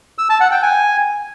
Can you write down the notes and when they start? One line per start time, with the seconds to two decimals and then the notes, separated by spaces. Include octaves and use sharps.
0.18 E6
0.29 A5
0.40 F#5
0.52 G5
0.63 G#5